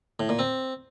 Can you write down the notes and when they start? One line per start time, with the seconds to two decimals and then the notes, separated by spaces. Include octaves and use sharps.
0.20 A2
0.29 A#2
0.39 C4